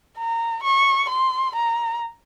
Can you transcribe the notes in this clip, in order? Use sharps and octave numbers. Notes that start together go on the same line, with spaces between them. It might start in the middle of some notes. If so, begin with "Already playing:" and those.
A#5
C#6
C6
A#5